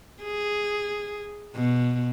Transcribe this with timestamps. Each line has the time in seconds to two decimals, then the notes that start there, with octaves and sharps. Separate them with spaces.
0.23 G#4
1.55 B2